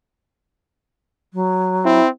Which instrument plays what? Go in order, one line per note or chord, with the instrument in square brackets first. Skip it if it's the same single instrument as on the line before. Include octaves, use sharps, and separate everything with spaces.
[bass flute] F#3
[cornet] C4 [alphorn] E4